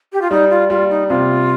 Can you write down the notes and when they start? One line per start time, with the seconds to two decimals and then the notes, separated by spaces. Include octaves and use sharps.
0.13 G4
0.22 F4
0.31 G3 D#4
0.50 F4
0.70 G3 F4
0.90 D#4
1.09 C3 F4